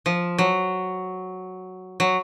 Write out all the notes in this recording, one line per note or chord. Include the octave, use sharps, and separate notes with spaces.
F3
F#3
F#3